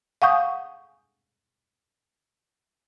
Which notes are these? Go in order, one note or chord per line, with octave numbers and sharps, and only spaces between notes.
F5 F#5 G#5 C#6 D#6 G6